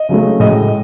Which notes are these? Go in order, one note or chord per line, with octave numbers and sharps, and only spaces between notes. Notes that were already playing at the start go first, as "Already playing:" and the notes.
Already playing: D#5
C#3 F#3 A3
A2 G#3 D#5